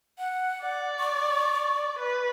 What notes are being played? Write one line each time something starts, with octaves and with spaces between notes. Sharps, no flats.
F#5
D5
C#6
B4